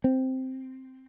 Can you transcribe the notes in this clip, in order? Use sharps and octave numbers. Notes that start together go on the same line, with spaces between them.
C4